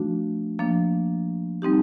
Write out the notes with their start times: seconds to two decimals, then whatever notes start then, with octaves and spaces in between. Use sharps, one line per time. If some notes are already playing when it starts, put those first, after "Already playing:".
Already playing: F3 A3 D4 F#4
0.59 F3 A#3 D4
1.62 G3 C4 D#4 G4